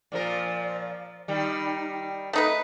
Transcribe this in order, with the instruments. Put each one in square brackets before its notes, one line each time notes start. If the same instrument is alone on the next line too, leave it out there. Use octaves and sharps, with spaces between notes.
[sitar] A#2 F3 A#4 [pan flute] D5
[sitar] D#3 G3 [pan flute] D#4
[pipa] A3 D#4 B4 [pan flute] D#6